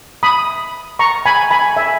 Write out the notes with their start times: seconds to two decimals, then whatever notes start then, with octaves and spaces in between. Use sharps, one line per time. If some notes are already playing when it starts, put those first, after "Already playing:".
0.23 B5 D#6
0.99 A#5 C#6
1.26 G#5 B5
1.51 G#5 B5
1.76 E5 G#5